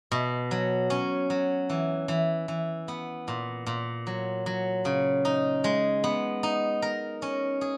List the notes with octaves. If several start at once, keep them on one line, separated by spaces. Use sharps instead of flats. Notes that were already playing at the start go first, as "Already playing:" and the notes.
B2
F#3
C#4
F#3
E3
E3
E3
B3
A#2
A#2
F#3
F#3
C#3
D#4
G#3
B3
D#4
A#4
C#4
G#4